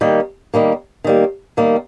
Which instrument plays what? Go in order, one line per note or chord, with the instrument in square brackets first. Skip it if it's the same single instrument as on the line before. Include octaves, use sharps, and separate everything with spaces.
[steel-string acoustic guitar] D#3 G3 A#3
D#3 G3 A#3
D#3 G3 A#3
D#3 G3 A#3